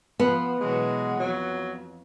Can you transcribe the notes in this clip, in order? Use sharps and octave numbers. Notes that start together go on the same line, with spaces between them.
F3 B3 F#5
B2 E3 F#3 G#3
F2 F#3